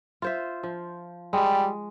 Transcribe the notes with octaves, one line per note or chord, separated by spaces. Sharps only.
F4 C5 E5
F3
G3 G#3